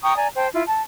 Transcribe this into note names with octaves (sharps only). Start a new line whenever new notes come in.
G5 A#5 C#6 D#6
D5 G#5 A#5
C5 G5 A5
E4 F4
A5